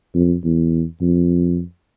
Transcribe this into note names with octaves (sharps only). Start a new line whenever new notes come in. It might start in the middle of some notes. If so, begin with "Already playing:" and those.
F2
E2
F2